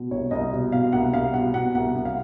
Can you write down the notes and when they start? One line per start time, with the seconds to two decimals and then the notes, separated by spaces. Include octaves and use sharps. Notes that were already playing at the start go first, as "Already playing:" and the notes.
Already playing: B2
0.11 C2 C#5
0.31 C2 D#5
0.52 B2
0.72 B2 F5
0.92 C2 F#5
1.13 C2 F5
1.34 B2 F#5
1.54 B2 F#5
1.75 C2 F#5
1.95 C2
2.05 F5